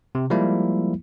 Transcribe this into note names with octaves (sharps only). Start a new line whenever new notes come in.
C3
F3 G3 G#3 A#3 E4